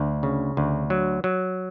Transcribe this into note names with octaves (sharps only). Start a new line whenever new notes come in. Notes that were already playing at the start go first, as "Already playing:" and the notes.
Already playing: D2
C#3
D2
F#3
F#3